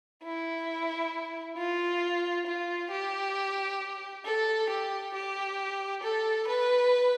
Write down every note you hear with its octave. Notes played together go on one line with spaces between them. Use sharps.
E4
F4
F4
G4
A4
G4
G4
A4
B4